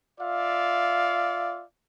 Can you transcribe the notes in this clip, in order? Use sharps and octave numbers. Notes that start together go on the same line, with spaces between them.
F4 D5 E5 F5